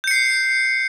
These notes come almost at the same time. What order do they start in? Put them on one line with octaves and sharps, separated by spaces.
G6 C#7 C7